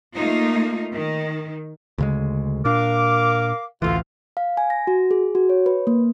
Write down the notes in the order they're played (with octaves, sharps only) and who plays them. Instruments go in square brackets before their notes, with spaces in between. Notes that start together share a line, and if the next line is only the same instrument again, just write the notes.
[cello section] A3 A#3 D#4 F4
D#3
[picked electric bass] D2 C#3 G#3
[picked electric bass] A#2 D4 [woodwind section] A#4 F5 D6
[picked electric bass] A1 D2 E3 [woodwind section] D3 F4 F5
[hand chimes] F5
G#5
A#6
F#4
G#4
F#4
C#5
B4
A#3